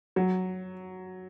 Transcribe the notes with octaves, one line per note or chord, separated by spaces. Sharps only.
F#3